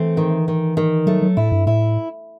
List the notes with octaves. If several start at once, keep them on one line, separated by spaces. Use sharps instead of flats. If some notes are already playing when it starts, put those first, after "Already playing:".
Already playing: E3 A3 C4
D#3
D#3
D#3
F#3 A3
F#3
A2 E4
G2
A2 E4